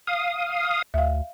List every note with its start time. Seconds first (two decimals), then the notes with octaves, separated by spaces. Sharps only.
0.07 F5 D#6
0.94 D2 E5 F5